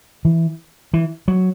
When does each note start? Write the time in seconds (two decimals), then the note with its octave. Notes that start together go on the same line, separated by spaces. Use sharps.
0.25 E3
0.93 E3
1.28 F#3